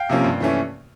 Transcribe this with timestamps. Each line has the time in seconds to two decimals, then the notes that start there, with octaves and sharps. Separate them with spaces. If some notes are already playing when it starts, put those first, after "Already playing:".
Already playing: F5 G5
0.09 C3 F3 A#3 C#4
0.24 G2
0.40 E3 A3 C#4